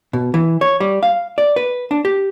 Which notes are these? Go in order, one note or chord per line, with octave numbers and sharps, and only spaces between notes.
B2
E3
C#5
G3
F5
D5
B4
D4
G4